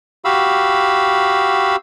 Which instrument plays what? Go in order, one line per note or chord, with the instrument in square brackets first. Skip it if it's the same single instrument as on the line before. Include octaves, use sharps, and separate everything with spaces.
[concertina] F#4 G4 F5 B5 E6